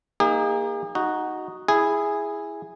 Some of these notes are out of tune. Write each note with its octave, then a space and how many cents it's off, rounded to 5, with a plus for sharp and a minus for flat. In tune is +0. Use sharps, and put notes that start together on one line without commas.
A#3 +0 D#4 +10 G#4 -45
D#4 +0 F#4 +0
E4 +0 G#4 -10